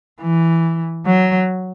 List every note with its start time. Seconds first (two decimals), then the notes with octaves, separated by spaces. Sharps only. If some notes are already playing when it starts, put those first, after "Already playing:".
0.21 E3
1.06 F#3